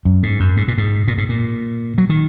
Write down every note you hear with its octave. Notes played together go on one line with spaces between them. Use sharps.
F#2
G#2
F#2
G#2
A#2
G#2
A#2
G#2
A#2
F#3
D#3